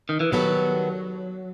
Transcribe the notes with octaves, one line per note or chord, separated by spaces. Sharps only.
D#3
E3
D#3 F#3 G3 B3 F#4 A4